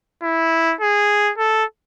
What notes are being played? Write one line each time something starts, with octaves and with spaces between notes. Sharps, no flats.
E4
G#4
A4